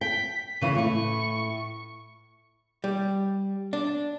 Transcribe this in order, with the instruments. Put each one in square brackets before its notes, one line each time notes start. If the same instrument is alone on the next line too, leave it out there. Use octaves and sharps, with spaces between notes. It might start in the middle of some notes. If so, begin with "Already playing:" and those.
[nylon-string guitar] G5 [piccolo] B6
[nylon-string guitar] C#3 E3 [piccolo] D#7
[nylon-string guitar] A2 E4 [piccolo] C#6
[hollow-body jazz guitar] G3
D4